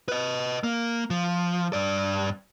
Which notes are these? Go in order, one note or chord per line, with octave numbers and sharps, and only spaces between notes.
B4 D#5
A#3
F3
G2 D5